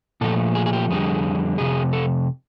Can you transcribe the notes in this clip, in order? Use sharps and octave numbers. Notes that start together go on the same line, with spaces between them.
A#2 F3 A3 A4
G#4
G#4
G4
F2 D3 G3 G#4
F2 C3 G#4
A4